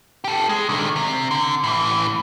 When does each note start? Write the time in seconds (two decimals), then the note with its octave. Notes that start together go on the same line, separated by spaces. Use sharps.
0.24 G4 A4
0.49 G#3
0.69 D3 D#3
0.96 C3
1.31 D3
1.64 A2 E3